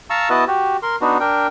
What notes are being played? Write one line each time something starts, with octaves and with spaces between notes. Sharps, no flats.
F5 A5 A#5 C#6 E6
B3 E4 F#4 B4 D#5 A5
F#4 G4
A#4 C6
B3 D4 D#4 F#4
D4 A#4 G5